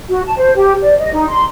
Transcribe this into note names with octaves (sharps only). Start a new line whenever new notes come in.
F#4
A5
C5
G4
D5
D#5
D#4
C6